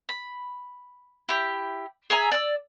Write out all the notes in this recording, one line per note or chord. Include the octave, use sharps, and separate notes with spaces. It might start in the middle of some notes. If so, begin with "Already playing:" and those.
B5
E4 G4
G#4 E5 G#5 A#5
D5 E6